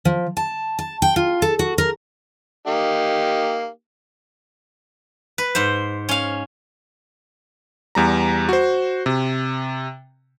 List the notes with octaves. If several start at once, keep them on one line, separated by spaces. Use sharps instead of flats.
F3
A5
A5
G5
F4
A4
F#4
A#4
A#3 D#4 G4
B4
G#2 C5
C#4 F5
E2 G3 A#5
F#4 C5
C3